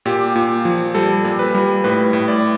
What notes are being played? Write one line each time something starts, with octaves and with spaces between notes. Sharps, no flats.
A#2 G4
A#2
F3
G3 A4
A#2
B4
G3
A2 B4
A2
D5